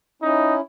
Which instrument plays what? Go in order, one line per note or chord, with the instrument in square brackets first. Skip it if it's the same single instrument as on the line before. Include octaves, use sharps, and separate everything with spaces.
[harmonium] C#4 E4 [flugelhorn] D#4